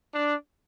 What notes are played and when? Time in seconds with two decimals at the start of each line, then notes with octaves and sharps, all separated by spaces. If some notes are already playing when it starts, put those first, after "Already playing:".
0.13 D4